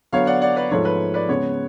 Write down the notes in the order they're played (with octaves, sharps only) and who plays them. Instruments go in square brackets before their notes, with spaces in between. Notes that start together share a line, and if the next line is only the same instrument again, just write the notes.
[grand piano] D3 F#3 B3 [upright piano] C#5 F5
[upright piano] D5 F#5
D5 F#5
B4 D5
[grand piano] G#2 F3 A3 F4 [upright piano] C#5
[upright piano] B4
B4 D5
[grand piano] C#3 G#3 B3 [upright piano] C#5